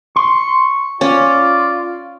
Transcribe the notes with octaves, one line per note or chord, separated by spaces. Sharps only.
C6 C#6
C#4 F4 D5